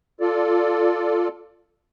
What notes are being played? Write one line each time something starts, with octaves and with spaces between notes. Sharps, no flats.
F4 A4 D5